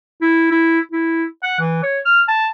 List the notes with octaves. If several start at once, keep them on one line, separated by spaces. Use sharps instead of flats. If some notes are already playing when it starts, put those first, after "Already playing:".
E4
E4
E4
F#5
E3
C#5
F6
A5